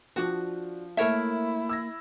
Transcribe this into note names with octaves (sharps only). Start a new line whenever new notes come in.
F3 D4 F#4
A3 A#3 E4 A#4 C#5 E5 A5
E6 G#6 A#6